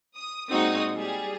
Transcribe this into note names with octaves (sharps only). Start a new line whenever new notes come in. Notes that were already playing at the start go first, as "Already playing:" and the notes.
D#6
A#2 G#3 C4 D#4 F#4 D#6
G3 G#4